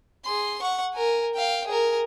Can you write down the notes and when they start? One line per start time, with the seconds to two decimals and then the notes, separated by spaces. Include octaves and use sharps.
0.25 G#4 C6
0.62 F#5 C#6
0.94 A#4 G#5
1.34 F5 G5
1.67 G#4 A#4